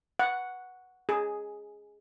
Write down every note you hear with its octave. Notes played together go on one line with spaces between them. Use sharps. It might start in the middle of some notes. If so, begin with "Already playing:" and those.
F#5
G#4